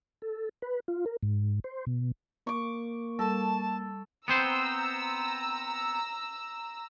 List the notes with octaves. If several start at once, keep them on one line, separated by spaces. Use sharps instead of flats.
A4
B4
F4
A#4
G#2
C5
B2
A#3 C#6 D6
G3 A4 A5
B3 C4 C5 A#5 E6